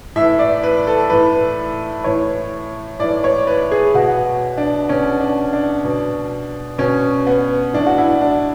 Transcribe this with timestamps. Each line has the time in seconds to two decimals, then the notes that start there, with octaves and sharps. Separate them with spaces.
0.16 A2 E3 E5
0.39 D5
0.63 B4
0.87 A4
1.10 A2 E3 B4
2.04 A2 E3 C#5
2.99 A2 E3 D5
3.24 C#5
3.47 B4
3.71 G#4
3.94 B2 F#4
4.58 D4
4.89 B2 C#4
5.20 D4
5.53 D4
5.84 B2
6.78 B2 C#4
7.27 B3
7.73 A2 E3 D4
7.86 F#4
7.98 E4
8.22 D4